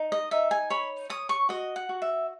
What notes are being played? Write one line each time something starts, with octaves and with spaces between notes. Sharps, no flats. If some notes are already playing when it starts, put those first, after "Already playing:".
Already playing: D#4
D#5
D#4 E5
G#5
C#5 B5
C#5 D#6
C#6
F#4 D#5
F#5
F#4
E5